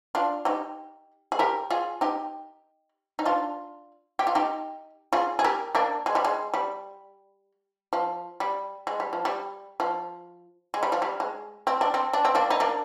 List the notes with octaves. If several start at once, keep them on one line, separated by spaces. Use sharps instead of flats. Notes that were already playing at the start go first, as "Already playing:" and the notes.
D4 F4
D#4 G4
G#4
G4 A#4
F4 G#4
D#4 G4
D#4
D4 F4
G4
F4
D#4 G4
F4 G#4
G#4
G4 A#4
A#3 D4
G#3
G3
G#3
G3
F3
G3
G#3
G3
F3
G3
F3
G#3
G3
F3
G3
G#3
C4
D4
C4
D4
C4
A#3 D4
D#4
A#3 D4